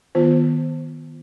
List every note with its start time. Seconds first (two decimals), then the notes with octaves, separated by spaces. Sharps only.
0.15 D#3 B3 F4 C5